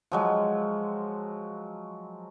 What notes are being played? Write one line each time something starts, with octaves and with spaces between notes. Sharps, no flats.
F3 F#3 G#3